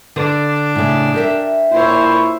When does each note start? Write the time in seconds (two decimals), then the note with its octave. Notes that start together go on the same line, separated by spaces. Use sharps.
0.16 D3 D4
0.75 A2 C#3
1.14 G4 A#4 E5
1.72 A#2 E4 C5 C#5